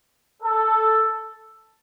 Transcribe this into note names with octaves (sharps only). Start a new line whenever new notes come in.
A4